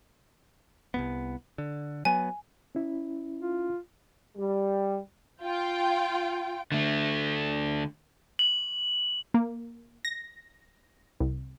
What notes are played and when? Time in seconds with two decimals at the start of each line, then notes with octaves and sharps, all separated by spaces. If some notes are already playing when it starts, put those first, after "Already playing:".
0.94 C2 F#2 B3
1.58 D3
2.05 F#3 B3 G#5
2.75 C#4 E4
3.41 F4
4.37 G3
5.41 F4 G5
6.72 D3 A3
8.39 F#7
9.34 A#3
10.05 A#6
11.20 C2